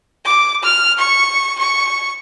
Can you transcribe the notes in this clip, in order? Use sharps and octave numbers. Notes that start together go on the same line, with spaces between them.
D6
F6
C#6
C#6